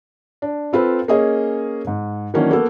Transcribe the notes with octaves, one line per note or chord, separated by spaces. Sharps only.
D4
C4 F4 A4 B4 C5
A#3 C#4 G#4 C#5 D#5
G#2
D#3 E3 F#3 A#3 C#4 D4
A#3 B3 F#4 A4